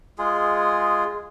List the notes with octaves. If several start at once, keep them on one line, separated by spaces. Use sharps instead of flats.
G#3 F4 G#4